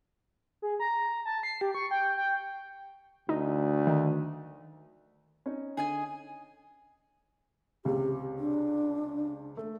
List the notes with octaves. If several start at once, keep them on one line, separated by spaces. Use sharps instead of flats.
G#4
A#5
A5
C7
G4
C#6
G5
G5
D2 D#4
D#3
C#4 D#4
D3 G#4 D#5 G#5
C#2 C3 G4
D4
A3